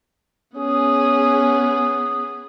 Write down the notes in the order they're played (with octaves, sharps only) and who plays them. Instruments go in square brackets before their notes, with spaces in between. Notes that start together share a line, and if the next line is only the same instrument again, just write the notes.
[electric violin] B3 G#4 [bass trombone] C#4 [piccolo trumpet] D#6